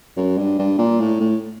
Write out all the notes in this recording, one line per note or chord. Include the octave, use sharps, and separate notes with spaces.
F#2
G2
G2
A#2
A2
A2